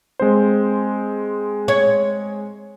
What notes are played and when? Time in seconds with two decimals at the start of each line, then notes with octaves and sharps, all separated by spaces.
0.20 G#3 C4 C5
1.68 C#5